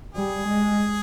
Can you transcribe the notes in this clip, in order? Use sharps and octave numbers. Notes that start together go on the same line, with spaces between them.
G3 G#4
G#3